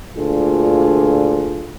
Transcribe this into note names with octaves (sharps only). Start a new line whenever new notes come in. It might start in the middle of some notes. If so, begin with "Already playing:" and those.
D2 A#2 D4 F4 G#4 A4